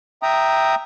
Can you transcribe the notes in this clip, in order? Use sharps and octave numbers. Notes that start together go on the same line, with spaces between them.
E5 G5 A#5 D#6